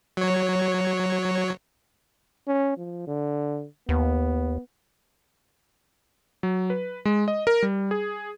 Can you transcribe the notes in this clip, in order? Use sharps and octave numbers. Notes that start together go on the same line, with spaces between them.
F#3 C#5
C#4
F3
D3
D#2 B3
F#3
B4
G#3
D#5
A#4
G3
G#4